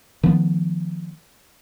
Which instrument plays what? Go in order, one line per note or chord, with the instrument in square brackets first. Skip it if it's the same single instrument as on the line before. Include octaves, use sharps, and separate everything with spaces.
[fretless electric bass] D#3 F3 A3 B3